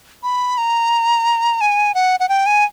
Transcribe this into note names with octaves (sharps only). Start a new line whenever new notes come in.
B5
A#5
G#5
F#5
F#5
G5
G#5